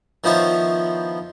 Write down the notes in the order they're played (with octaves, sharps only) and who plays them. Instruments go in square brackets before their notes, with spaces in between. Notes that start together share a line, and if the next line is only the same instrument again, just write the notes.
[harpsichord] D#3 F3 B3 E4 C5 C#5